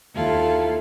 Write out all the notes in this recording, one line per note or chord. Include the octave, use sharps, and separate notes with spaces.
D#2 E4 F4 A4 F5